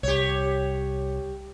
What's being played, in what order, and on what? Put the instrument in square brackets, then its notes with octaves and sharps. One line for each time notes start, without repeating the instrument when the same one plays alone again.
[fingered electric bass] C2 [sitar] G4 C#5